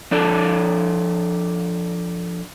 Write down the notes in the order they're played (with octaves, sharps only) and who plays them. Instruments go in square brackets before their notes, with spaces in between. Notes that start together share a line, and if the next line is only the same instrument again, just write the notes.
[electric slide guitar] F3 D4 A4 D5